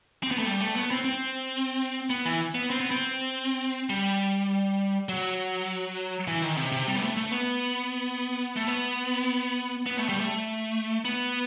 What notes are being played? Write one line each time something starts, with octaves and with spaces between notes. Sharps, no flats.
C4
B3
A3
G3
A3
B3
C4
C4
B3
E3
B3
C4
B3
C4
G3
F#3
E3
D#3
C3
C3
G3
B3
A3
A3
B3
A3
B3
B3
A3
G3
A3
B3